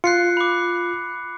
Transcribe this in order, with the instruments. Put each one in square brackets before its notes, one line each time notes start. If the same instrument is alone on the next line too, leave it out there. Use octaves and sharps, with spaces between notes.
[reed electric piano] F4 [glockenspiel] F#6 C7 C#7
[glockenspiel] B5 D6